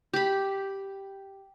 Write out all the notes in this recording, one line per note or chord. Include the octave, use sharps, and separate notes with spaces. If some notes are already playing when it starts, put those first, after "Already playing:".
G4 B5